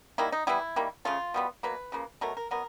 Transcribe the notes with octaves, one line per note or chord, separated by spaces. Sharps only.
D#3 G3 A#3 E4
D#4
E3 G3 B3 E4
D#3 G3 A#3
C#3 F3 A3 F4
B2 G3 B3
B2 F#3 A#3 B4
C#3 F3 A#3
B2 F#3 A3 A#4
A#4
B2 F#3 B3 A#4